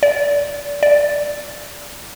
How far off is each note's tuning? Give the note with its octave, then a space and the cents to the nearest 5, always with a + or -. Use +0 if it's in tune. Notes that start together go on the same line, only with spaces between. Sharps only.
D5 -30
D5 -5